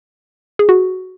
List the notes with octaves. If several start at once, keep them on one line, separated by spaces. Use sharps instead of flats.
G#4
F#4